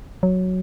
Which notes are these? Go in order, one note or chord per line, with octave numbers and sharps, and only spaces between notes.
F#3